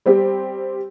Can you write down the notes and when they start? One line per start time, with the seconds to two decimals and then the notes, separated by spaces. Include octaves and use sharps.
0.06 G3 C4 G4